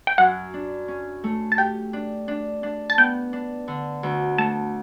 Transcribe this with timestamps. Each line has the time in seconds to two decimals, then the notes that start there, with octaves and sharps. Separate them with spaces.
0.07 G5
0.18 F#2 F#5
0.54 D4
0.88 C#4
1.24 A3
1.52 A5
1.58 G4 G5
1.93 D4
2.28 D4
2.63 D4
2.90 A5
2.98 B3 G5
3.33 D4
3.68 D3
4.03 D2
4.38 A3 A5